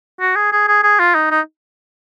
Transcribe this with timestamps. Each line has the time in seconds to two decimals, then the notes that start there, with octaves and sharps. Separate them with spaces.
0.20 F#4
0.36 G#4
0.52 G#4
0.68 G#4
0.83 G#4
0.99 F4
1.15 D#4
1.31 D#4